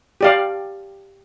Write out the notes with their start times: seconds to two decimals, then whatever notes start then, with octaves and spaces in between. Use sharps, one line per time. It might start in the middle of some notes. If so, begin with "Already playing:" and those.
0.21 G4 D5 F5